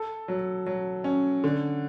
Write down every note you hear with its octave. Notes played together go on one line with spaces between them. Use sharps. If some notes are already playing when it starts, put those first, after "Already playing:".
Already playing: A4
F#3
F#3
C#4
D3